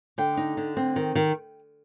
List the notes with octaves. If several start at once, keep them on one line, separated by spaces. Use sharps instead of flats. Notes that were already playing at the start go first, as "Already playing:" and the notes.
D3 G5
D#4
D3
C4
D#3
D#3